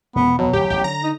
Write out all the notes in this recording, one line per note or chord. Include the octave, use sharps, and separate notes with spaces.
E1 F2 B3
B2 F#3
D1 E2 G4
A1 E2 C3 G4
D3 A#5
D#4